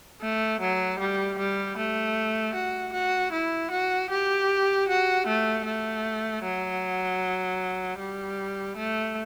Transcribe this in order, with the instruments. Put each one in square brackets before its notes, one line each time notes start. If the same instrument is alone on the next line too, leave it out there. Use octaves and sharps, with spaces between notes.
[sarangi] A3
F#3
G3
G3
A3
F#4
F#4
E4
F#4
G4
F#4
A3
A3
F#3
G3
A3